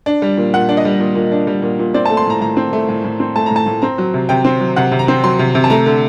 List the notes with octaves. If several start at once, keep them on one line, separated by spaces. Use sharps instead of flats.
D4
G3
A#2
A#2 F#5
D4
D#5
G3
A#2
A#2
D4
G3
A#2
A#2
C4 D5
A5
A3
C6
A2 A#5
A2 A#5
C4
A3
A2
A2
C4
A3 A5
A2 A#5
A5
A2
C4 A#5
F#3
C3
C3 G5
C4
F#3
C3 F#5
C3
A#5
C4
F#3 C6
C3
C3
A5
A3 A#5
D3